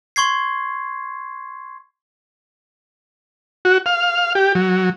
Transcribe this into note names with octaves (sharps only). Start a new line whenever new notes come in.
C6 C#6 G#6 C7
F#4
F5
G4
F#3